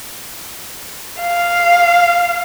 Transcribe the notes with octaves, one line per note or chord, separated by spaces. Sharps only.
F5